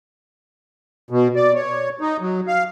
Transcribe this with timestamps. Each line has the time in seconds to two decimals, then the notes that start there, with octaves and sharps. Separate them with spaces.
1.10 B2
1.36 D5
1.55 C#5
2.01 D#4
2.21 F#3
2.48 F5